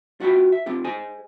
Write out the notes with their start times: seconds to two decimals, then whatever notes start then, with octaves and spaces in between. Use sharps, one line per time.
0.20 F4 F#4 E5 G5 B5
0.52 E5
0.66 C4 F4 G4
0.84 G#4 C5 D#5 G#5